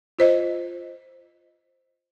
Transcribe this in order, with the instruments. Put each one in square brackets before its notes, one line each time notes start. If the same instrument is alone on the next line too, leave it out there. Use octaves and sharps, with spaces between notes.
[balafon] F4 C5 D#5